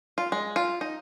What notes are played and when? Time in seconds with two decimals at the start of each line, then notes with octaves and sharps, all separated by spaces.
0.18 F4
0.32 G#3
0.56 F4
0.81 D#4